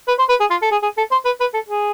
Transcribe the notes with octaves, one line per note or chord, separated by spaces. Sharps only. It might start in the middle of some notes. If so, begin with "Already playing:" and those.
B4
C5
B4
G#4
F4
A4
G#4
G#4
A4
C5
B4
B4
A4
G#4